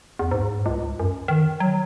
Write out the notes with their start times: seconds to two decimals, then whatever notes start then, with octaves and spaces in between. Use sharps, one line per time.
0.19 E2
0.31 G#2
0.66 C#2
1.00 F#2
1.28 D#3
1.60 F#3